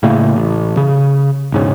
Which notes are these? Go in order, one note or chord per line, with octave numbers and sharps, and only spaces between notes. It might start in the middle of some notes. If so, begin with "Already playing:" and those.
A2 C#3 A3 A#3
A1
C#3
E1 G#2 C#3